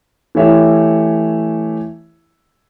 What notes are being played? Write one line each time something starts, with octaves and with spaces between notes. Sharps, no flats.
E3 A3 E4 G4 C#5 E5